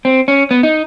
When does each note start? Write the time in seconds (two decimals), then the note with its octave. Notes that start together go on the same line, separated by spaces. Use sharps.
0.05 C4
0.28 C#4
0.51 B3
0.63 D#4